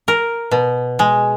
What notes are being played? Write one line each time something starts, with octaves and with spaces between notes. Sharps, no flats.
A#4
B2
G#3